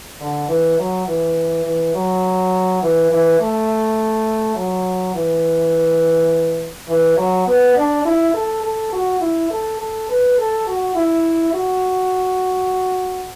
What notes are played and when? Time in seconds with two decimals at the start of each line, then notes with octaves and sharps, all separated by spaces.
0.20 D3
0.49 E3
0.79 F#3
1.08 E3
1.65 E3
1.95 F#3
2.83 E3
3.11 E3
3.40 A3
4.56 F#3
5.15 E3
6.89 E3
7.17 F#3
7.47 B3
7.77 D4
8.05 E4
8.34 A4
8.64 A4
8.93 F#4
9.21 E4
9.50 A4
9.79 A4
10.09 B4
10.38 A4
10.67 F#4
10.96 E4
11.54 F#4